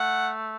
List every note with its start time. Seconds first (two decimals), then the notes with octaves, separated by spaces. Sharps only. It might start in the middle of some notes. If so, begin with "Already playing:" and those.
Already playing: A3 F#5